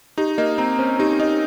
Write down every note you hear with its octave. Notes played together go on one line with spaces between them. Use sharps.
D#4 G4
A#3 D#5
C4 A#5
C#4 C5
D#4 G4
D#4 D#5